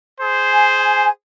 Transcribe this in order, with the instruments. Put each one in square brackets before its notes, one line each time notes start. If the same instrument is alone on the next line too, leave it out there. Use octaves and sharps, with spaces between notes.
[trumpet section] G#4 C5
[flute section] G#5